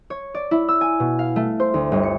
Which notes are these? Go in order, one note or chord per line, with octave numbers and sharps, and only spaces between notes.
C#5
D5
E4
E6
G#5
B2
F5
A3
C5
D2
G1
C#7